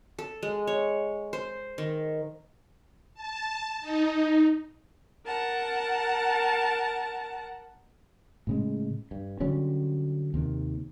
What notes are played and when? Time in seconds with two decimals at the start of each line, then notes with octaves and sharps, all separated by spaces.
0.19 A4
0.43 G#3
0.67 C#5
1.33 C5
1.78 D#3
3.15 A5
3.81 D#4
5.27 A#4 F#5 A5
8.47 A2 C#3 G#3
9.11 G2
9.40 D3 F#3 G3 C#4
10.34 D#2 C3 D#3